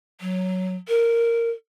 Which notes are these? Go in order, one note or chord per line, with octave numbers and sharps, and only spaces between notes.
F#3
A#4